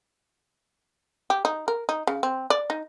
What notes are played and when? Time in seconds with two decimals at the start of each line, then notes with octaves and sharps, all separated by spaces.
1.30 G4
1.45 D#4
1.68 A#4
1.89 D#4
2.07 C#3
2.23 C4
2.50 D5
2.70 D#4